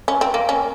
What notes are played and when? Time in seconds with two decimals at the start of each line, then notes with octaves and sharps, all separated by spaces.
0.08 C#4
0.21 C4
0.34 A#3
0.49 C#4